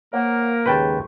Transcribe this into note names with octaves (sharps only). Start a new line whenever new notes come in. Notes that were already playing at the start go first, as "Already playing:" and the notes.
A#3 A#4 C5 C#5 F#5
D#2 G#2 C#3 B4 G5 A5 C6 C#6